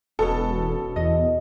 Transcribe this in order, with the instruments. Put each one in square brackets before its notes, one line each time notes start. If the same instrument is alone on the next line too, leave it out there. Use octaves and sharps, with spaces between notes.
[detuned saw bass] E1 [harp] B2 B3 C#4 [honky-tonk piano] A4
[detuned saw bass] E2 [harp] D#5